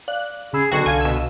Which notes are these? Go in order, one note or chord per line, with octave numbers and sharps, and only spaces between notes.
D5 F5 F#6
C#3 G#4 B5 E6
B1 D3 F#4 G5 C#6 C7
C2 F5 G#5
B2 E6